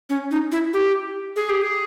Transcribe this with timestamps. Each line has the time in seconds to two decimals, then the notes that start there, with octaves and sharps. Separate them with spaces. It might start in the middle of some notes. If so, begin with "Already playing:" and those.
0.10 C#4
0.31 D#4
0.52 E4
0.73 G4
1.36 G#4
1.49 G4
1.62 G#4